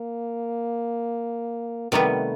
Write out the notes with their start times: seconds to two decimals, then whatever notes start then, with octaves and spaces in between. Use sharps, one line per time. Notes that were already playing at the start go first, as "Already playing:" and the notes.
Already playing: A#3
1.92 C3 D#3 G3 A3 B3